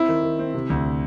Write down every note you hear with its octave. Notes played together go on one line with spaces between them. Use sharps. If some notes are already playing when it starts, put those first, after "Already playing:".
Already playing: C4 E4
D#3
D#3
C4
C3
D2